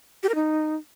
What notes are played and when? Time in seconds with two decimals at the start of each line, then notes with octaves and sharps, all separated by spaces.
0.23 G4
0.29 A#4
0.35 D#4